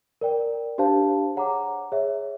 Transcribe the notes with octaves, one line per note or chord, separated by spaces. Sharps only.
A#4 D5 G5
D4 G4 C5 F5 A5
G#4 C#5 F#5 A#5 D6
G#4 C#5 E5